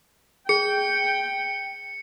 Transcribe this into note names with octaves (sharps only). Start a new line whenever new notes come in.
G#4 G5 C#7